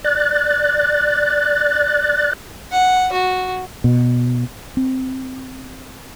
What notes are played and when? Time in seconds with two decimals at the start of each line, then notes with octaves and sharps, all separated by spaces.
0.04 D5 F#6 A6
2.72 F#5
3.12 F#4
3.84 B2
4.77 C4